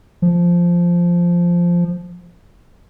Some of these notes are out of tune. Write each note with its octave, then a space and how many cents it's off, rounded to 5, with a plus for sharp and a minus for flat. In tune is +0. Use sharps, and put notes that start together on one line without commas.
F3 -5